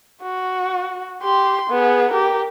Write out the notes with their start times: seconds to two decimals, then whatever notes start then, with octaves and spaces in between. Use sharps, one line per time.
0.22 F#4
1.23 G4 C6
1.70 B3 G#4
2.11 G4 A#4